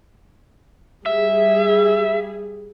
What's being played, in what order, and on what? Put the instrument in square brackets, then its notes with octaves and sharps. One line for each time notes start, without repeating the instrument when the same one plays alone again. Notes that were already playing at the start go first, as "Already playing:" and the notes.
[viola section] G3 G#4 [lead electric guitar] E5